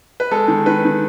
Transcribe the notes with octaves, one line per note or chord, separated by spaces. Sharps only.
B4
G#3 A4
D#3
D#3 B4
D#3